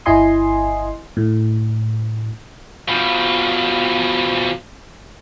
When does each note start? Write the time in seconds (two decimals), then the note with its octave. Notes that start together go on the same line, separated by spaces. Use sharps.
0.06 G1 E4 D#5 G#5 C6 D#6
1.17 A2
2.88 B2 F3